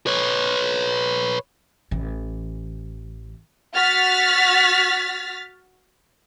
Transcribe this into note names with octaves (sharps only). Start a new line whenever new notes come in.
B4 C#5
A1 E3
F#4 F6 A6 B6